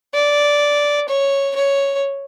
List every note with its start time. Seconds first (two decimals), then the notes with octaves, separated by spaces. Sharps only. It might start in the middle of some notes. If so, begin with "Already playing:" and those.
0.14 D5
1.08 C#5
1.56 C#5